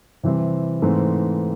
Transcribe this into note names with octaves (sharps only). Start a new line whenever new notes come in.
C3 E3 G3 C4 E4
G#2 E3 A3 C4